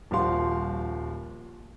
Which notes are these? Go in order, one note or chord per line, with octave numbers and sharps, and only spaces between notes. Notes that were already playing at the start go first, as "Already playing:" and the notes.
D#1 F3 G3 F#4 F5 C6